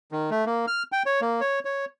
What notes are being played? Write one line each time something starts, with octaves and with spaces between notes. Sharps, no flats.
D#3
A3
A#3
F6
G5
C#5
A#3
C#5
C#5